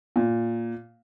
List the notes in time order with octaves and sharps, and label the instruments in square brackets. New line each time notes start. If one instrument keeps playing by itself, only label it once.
[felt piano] A#2